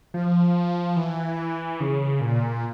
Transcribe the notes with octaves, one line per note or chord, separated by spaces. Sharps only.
F3
E3
C#3
A#2